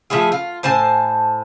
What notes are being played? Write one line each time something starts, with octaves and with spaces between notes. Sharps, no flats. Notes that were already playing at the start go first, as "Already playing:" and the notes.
F3 A3 E4 G#4
F4
A2 C5 G#5 A5